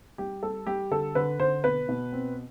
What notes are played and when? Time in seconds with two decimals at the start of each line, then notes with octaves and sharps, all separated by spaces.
0.18 G3 G4
0.43 G3 A4
0.67 G3 G4
0.91 D3 A4
1.15 D3 B4
1.39 D3 C5
1.64 B2 B4
1.89 B2
2.13 C4